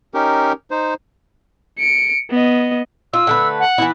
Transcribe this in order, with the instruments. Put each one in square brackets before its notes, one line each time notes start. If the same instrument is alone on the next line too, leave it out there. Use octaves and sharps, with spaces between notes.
[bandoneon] C#4 D#4 G4 A#4
D#4 C5
[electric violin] C#7 D7
B3 D#5
[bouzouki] F4 [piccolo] E6
[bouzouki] D3 A3 B4
[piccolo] F#5
[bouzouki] E3 B3 E4